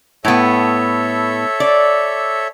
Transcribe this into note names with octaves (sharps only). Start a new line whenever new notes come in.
A2 B3 A4 C#5 E5
D5